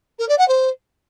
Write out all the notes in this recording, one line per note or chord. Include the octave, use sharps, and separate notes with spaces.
A#4
D5
F#5
C5